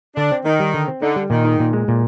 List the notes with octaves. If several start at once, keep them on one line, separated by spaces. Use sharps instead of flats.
D3 D4
C4
D#3 D#4
G3
D3
C4
D3 D#4
G3
A#2 D#3
D#4
A#2
G#3
A#2